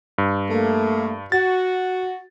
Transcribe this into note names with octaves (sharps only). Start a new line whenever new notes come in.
G2
A3 A#3
F#4 A6